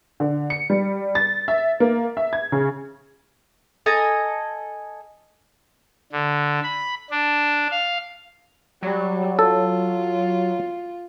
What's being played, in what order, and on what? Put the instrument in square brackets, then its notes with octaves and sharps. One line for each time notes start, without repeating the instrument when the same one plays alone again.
[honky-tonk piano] D3
C#7
G3
A6
E5
A#3
E5
G#6
C#3
[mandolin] A4 D#5 G#5 A#5
[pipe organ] D3
B5
D4
F5
[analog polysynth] F#3 [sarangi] G3
[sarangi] F4 [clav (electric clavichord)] A4